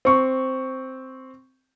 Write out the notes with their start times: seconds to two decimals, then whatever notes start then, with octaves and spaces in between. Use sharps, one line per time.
0.05 C4 C#6